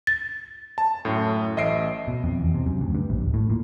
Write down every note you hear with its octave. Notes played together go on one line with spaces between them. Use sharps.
A6
A5
F#2 A2
A1 D#5 E5 C7 D7
B2
F2
E2
C3
F#2
D2
G2
A#1
D1
A2
A#2